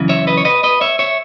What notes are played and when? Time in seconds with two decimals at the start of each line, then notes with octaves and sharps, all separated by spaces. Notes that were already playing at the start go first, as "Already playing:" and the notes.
Already playing: F#2 C#3 E3
0.09 C#5 E5
0.27 B4 D#5
0.37 C#5
0.45 B4 D#5
0.64 B4 D#5
0.81 C#5 E5
0.99 C#5 E5